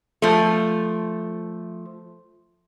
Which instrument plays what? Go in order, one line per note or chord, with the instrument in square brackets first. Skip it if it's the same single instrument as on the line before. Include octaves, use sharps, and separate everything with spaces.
[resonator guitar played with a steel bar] F3 A3